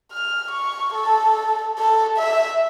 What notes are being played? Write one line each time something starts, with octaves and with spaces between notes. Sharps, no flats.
F6
C#6
A4
A4
E5